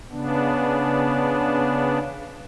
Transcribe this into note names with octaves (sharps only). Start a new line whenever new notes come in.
C#3 B3 D4